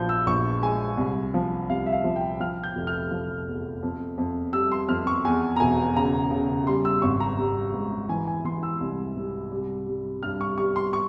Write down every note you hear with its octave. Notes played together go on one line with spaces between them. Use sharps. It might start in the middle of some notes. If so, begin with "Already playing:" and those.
Already playing: A#1 F3 G6
E6
A#1 C#6
G#3 G#5
C2
F3
C2 F5
E5
F5
F3
G5
F3 F6
G6
F1
F6
F3
E2
F2
F2
G3 E6
C6
F2 F6
C#6
E2 G#5
A#5
E1 G#5
C#3 A#5
C#3
G3 C6
E6
G#1 C#6
A#5
G3
G#2
E3 G#5
G#5
E3 C6
E6
C2
C3
G3
G3
G2 F6
C#6
G3 C#6
C6
C#6